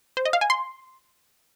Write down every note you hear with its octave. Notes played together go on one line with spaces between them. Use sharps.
C5
D#5
F5
G#5
C6